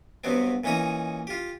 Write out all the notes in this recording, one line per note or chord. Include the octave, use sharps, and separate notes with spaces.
G2 B2 F#3 B3 C4
A#2 E3 C#4 D#4 A#5 D#6
F4 G4